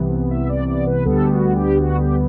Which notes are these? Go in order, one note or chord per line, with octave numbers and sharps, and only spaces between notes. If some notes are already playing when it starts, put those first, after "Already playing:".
Already playing: C2 C3 E3 B3
E5
D5
D5
B4
D2 D3 G3 B3 A4
F#4
G4
F#4
G4